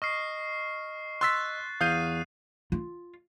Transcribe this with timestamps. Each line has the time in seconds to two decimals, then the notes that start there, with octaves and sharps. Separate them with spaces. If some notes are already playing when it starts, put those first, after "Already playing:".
0.02 D#5 C#6 F6 C7
1.21 C6 E6 F#6 A6 B6
1.81 E2 F5 D#6 G6 C7 D#7
2.72 F4